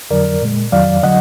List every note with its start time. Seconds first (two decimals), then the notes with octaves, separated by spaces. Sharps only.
0.10 F2 D3 F#3 A#4 D5
0.42 A#2 G#3
0.72 F2 D#3 F#3 D5 F5
1.03 D3 F#3 D#5 F#5